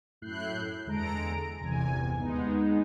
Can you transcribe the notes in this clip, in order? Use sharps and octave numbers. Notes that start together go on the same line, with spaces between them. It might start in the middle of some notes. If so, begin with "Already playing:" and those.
F#2 A2 E4 F#6 G6 C7
E2 D3 G#3 A4 A#5 D7
G1 E2 C3 G#5
D#2 G#3 B3 D#4